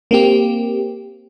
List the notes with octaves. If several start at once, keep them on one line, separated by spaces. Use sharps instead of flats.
A#3 C4 G4